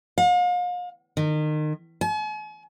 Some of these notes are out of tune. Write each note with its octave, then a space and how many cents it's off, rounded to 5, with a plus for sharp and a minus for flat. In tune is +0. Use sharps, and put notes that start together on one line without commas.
F5 +40
D#3 -30
G#5 +45